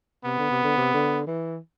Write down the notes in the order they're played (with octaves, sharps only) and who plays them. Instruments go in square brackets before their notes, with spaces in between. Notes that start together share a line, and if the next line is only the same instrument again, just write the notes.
[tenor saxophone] C3 [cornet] B3
[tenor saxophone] D3
C3
D3
C3
D3
E3